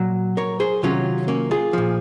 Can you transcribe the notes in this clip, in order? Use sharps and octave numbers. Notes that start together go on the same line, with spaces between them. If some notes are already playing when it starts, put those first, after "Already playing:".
Already playing: A#2 F#3 F#4
A#4 C#5
G#4 C5
C3 D#3 F#3 C#4 F4
A#3 C#4
F4 G#4
A#2 F3